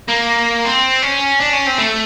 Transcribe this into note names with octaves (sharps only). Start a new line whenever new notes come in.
A#3
C4
C#4
D4
C#4
C4
A3